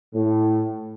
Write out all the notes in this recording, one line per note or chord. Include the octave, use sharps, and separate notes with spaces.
A2